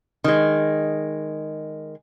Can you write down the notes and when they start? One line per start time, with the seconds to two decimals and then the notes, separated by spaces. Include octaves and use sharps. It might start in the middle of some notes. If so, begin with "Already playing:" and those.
0.24 D#3 G#3